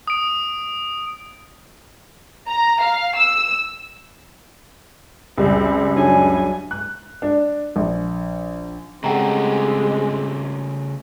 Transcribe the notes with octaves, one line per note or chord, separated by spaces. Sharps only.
D#6 D7
A#5
F5
E6
C#2 F#2 G3 C4
F#3 D4 C#5 G#5
F#6
D4
A#1
C#3 G#3 A3 C4 G4 F#5 G5 A#5